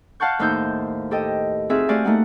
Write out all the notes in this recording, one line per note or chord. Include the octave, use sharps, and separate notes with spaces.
F5 F#5 A5 C#6 G6
D#2 A2 D#4 C5 E6 G6
G4 A4 D#5 G5
C4 D#4 F4 F#4 G#4 E5
A3 F#4 G4 D5 F5 G#5
A3 A#3 D#4 F#5